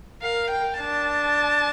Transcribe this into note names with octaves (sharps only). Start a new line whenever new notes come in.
A#4 F5
G5
D4 A5